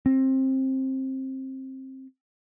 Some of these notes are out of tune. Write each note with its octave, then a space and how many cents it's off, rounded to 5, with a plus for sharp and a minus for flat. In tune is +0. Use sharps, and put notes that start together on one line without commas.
C4 +20